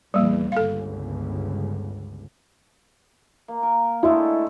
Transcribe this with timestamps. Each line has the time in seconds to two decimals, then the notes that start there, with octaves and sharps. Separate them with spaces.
0.14 E2 A#2 G3 A#3
0.52 G1 C#2 A4 F5
3.48 A#3
3.63 A#4
4.03 D3 G#3 A3 E4